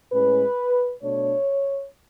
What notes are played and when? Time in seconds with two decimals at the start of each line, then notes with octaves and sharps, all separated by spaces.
0.11 A2 G#3 C#4 B4
1.03 B2 A3 D4 C#5